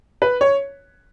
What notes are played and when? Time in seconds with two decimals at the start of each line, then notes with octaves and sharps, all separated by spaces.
0.22 B4
0.41 C#5